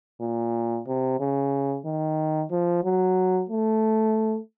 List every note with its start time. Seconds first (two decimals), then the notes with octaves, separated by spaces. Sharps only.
0.21 A#2
0.87 C3
1.20 C#3
1.85 D#3
2.51 F3
2.84 F#3
3.49 A3